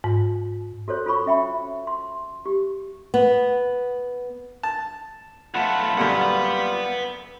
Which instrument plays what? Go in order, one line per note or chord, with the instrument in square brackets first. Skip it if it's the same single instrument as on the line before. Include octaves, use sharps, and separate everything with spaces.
[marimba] G#2
[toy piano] F#4 A4 C5 C#5
F4 A4 B5 C#6
C#4 E5 G5 B5
C6
G4
[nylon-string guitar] B3
[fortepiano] A5
[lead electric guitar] B1 A3 [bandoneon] F4 B5 [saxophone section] F#5
[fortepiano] F#2 A#2 D3 [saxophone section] G3 [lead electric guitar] B4 F#5